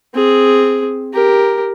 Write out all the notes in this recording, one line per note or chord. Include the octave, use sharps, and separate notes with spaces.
C4 G#4
G4 A#4